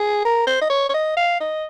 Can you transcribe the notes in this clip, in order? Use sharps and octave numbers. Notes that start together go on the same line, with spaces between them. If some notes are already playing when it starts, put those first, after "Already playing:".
Already playing: G#4
A#4
C5
D#5
C#5
C#5
D#5
F5
D#5